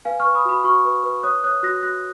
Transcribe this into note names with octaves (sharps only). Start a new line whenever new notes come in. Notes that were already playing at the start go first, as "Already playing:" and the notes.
B4 F5 G#5
B4 C#6 F6
B5 D#6
F#4 B5 D#6
F#4 C#6 F6
B4
B4
C#5 D#6 F#6
C#5 D#6 F#6
F#4 F#6 A#6
F#4 F#6 A#6